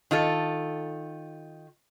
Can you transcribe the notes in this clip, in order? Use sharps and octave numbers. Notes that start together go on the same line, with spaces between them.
D#3 F4 A4